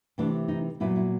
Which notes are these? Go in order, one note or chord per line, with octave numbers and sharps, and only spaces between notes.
C3 E3 A3 C4 D4
D#4
A#2 F#3 B3 E4
E4